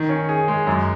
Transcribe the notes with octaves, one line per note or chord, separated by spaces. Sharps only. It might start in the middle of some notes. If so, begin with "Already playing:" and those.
Already playing: D#3
C#4
G#4
G#3
F#2